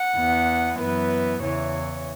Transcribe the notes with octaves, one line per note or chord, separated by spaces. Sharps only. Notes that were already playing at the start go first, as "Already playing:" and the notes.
Already playing: F#5
E2 E3 B3
F#2 E3 B3 B4
E2 C#3 E3 C#5